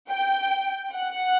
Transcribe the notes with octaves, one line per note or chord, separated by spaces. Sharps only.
G5
F#5